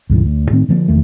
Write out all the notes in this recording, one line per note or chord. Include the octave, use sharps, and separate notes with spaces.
C#2 G2 B2 E3
D2
A2 D#3 C4
D3 F3 A3 A#3
F1 E2 D#3 A3